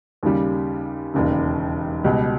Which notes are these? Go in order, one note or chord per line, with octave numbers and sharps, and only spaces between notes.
D#2 C#3 G3
E1 D#2 C#3
C#2 B2 G3